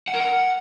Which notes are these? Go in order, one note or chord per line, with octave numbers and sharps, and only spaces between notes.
F#5
A#4
F#5